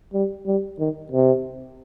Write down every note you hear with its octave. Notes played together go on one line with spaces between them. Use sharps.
G3
G3
D#3
C3